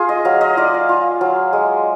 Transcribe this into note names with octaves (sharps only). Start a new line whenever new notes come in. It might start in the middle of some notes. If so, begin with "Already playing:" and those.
Already playing: F4 G#4
D#5
F#3 F5
D#5
F4 D5
D5
F4
F#3
G#3